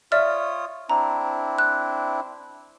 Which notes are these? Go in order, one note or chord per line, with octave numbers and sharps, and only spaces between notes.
F4 C#5 D5 E5 D#6 F6
C4 D4 E4 A#5
F#6